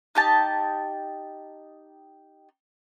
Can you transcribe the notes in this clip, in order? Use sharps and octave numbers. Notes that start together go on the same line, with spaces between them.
D#4 G4 A5